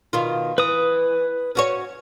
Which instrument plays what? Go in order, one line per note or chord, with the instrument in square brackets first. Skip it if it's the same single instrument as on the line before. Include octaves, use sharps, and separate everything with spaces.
[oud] B2 D#3 F4
[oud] E3 [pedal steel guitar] B4 D#6
[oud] C#4 F#4 C#5